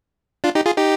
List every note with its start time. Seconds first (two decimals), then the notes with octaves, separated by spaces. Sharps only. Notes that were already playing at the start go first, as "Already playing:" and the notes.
0.44 D4 F4
0.55 D#4 G4
0.66 F4 G#4
0.77 D#4 G4